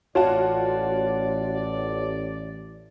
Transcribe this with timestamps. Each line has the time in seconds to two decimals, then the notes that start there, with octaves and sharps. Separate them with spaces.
0.15 A1 F4 F#4 C#5 D5 A5